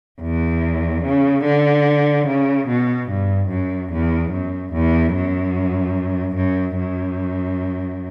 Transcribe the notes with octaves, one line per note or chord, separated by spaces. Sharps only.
E2
C#3
D3
C#3
B2
G2
F#2
E2
F#2
E2
F#2
F#2
F#2